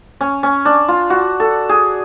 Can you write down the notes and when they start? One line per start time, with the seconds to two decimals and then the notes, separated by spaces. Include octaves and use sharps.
0.21 C#4
0.43 C#4
0.65 D4
0.88 F4
1.10 F#4
1.40 A4
1.69 G#4